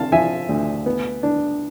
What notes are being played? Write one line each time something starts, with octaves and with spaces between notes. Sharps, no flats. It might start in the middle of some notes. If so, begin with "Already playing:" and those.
Already playing: C3 F5 A5
F3 E5 G#5
D2
B3
D4